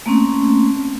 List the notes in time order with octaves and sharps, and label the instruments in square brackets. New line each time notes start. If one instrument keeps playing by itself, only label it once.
[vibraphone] A3 A#3 C4 C#4